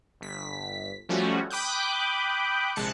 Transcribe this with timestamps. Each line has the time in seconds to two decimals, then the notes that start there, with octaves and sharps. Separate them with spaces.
0.21 G1 B6
1.09 F3 G3 A3 C#4 F#4
1.50 G5 B5 D6 D#6 F#6 G6
2.76 A#1 C3 G#3 A5 F#6 C#7